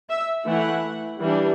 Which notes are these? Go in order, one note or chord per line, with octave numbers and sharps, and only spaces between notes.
E5
E3 A3 E4 F#5
E3 G3 D4